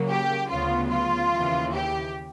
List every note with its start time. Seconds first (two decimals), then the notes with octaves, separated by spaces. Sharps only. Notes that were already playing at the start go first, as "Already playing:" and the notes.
Already playing: C#3 F#3 A#3
0.08 G4
0.49 D2 C#3 F#3 B3 F4
0.90 F4
1.31 D#2 C#3 E3
1.73 G4